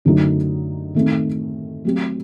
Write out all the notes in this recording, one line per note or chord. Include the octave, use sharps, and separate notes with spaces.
F#2 D3 F#3 A3 D#4
D#3 A3 C4 D#4
F#3 A3 C4 G4